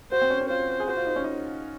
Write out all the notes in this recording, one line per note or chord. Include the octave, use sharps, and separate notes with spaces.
F#4 C5
C4
C#4
C#4
F4 C5
G#4
F#4 C5
F4
D#4
C#4
D#4